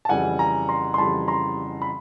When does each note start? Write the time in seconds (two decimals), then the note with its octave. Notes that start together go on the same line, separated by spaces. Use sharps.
0.05 A5
0.09 F2 C#3 E3 G3 F#5 G#5
0.39 G#5 A#5
0.69 A#5 C6
0.94 C6
0.98 F2 C#3 E3 G3 A5 B5
1.28 A#5 C6
1.82 B5